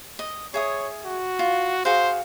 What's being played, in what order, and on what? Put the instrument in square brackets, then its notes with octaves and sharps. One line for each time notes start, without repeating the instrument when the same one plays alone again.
[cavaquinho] D#5
[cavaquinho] G#4 E5 D#6 [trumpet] C#5
[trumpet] F#4
[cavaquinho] F4
[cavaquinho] F#4 G#4 F5 [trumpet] C5